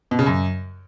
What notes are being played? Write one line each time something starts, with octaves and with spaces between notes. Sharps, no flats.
B2
C#3
F#2